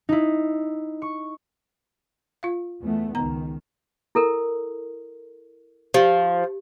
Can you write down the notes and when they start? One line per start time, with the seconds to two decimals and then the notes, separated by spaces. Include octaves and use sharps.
0.09 D#4 E4
1.02 C#6
2.43 F4 F5
2.83 E2 A3 B3
3.15 C#2 D#3 B3 A#5
4.15 E4 A4 A#4
5.94 F3 G4